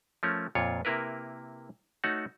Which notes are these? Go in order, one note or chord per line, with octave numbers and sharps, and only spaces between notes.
F3 A3 C#4 A#4
F2 A#2 F4 C#5
C3 A#3 E4 A#4 B4
A3 D#4 F#4 C#5 F#5